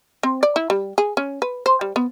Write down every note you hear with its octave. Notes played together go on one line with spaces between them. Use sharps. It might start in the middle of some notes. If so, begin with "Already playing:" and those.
C4
D5
E4
G3
G#4
C#4
B4
C5
G3
B3